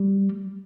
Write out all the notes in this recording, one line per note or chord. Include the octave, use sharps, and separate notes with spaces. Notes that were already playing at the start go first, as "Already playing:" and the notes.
Already playing: G3